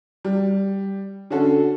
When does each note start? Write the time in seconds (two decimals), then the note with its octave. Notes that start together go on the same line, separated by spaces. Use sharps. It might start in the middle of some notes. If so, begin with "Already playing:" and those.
0.24 G3
1.30 D3 C#4 F#4 A4